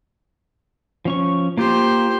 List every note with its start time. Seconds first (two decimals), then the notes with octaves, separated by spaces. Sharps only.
1.05 F3 C#4 C#6
1.57 A#3 F4 G4 C5 G6